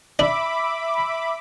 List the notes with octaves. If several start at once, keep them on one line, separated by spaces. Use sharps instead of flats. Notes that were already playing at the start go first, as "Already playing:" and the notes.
D4 E5 B5 D6